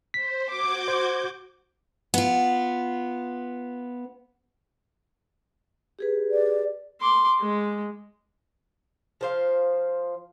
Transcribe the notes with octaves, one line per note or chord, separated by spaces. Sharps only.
C5 B6
F#4 D6 G6 G#6
C5
B3 F4
G4 G#4 B4
D5
C6 D6
G#3
F3 C5 F5